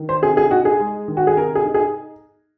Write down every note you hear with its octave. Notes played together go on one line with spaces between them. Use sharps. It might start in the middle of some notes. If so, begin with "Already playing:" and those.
Already playing: D#3
C5
C3 G#4
G#4
D#4 F#4
G#4
G#3
D#3
F#4
G#4
C3 A#4
G#4
D#4
G#4